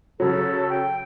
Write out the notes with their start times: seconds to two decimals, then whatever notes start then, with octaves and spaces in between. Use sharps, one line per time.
0.20 C#3 F#3 A4
0.70 G5